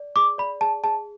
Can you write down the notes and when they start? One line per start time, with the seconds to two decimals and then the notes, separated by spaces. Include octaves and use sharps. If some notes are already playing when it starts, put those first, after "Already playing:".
Already playing: D5
0.16 G#4 D6
0.38 D5 B5
0.61 G#4 A5
0.84 G#4 A5